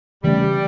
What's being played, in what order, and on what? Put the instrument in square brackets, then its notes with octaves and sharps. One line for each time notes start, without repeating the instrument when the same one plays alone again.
[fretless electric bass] C#3 E3 A3 C#4 [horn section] G3